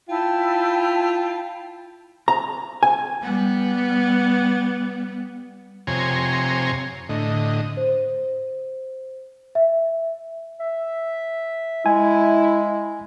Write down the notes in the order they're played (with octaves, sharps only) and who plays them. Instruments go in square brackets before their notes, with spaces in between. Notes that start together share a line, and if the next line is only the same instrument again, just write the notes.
[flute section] E4 G5 A5 [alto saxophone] F4
[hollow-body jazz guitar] A#5
G#5
[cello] G3 B3
[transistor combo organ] F2 C3 C#5 G#5 A#5 C6
A2 D3 D#5
[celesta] C5
E5
[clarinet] E5
[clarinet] G#3 [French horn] E4 [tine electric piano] G#5